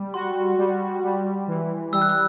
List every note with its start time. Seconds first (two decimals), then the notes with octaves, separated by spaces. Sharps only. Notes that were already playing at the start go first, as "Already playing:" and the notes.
Already playing: G3
0.14 F#4 C6
0.58 G3
1.04 G3
1.48 E3
1.93 G3 E6
2.02 F#6
2.09 E6